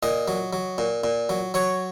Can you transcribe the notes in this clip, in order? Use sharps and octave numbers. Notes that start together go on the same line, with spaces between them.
A#2 D#5
F#3
F#3
A#2
A#2
F#3
F#3 C#5